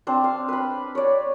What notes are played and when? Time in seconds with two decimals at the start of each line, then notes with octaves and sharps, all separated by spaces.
0.07 C4 D4 C5
0.24 F5
0.48 B4 B5
0.95 C#5 D5